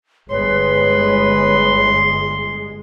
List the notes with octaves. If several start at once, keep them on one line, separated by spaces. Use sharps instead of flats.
G1 G#3 B4 C#5 C6